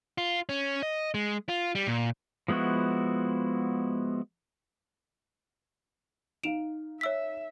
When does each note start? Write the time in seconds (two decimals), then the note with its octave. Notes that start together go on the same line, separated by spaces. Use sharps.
0.18 F4
0.49 C#4
0.83 D#5
1.14 G#3
1.49 F4
1.75 G3
1.87 A#2
2.48 F3 G#3 B3 E4 F#4
6.43 D#4 F5 D7 E7 F7
7.01 C#5 E5 E6 B6